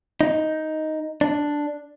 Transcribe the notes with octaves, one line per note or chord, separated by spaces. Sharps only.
D#4
D4